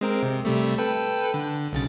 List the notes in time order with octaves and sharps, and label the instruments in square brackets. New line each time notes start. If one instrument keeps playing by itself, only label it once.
[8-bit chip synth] G#3 C4 A#4
C3
C3 G3 A3
A4 B4 G5
D3
B1 C#3 A6